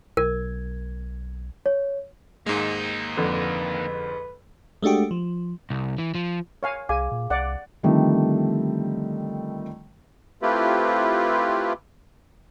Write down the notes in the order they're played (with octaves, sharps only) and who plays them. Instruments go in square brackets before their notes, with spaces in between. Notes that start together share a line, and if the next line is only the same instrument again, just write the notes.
[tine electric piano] B1 G#6 [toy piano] A#4
[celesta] C#5
[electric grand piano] G#2 G#3 [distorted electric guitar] A#3 D#4
[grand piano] F2 D3 [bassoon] B4
[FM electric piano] G#3 A3 D4 F#4 G4
F3
[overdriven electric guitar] C2
E3
F3
[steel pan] C#5 F5 G#5
[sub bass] C2 [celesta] G#4 F5 D6 [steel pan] G#5
[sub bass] A#2
[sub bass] C2 [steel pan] D5 F#5
[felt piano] D3 D#3 F3 G3 A3 C4
[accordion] A3 C4 E4 F4 G4 B4